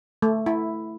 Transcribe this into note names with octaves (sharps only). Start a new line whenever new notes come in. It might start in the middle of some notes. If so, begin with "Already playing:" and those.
A3
E4